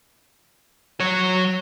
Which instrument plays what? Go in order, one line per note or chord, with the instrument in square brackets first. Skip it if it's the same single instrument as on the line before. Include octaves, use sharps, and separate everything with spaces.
[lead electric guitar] F#3 C#5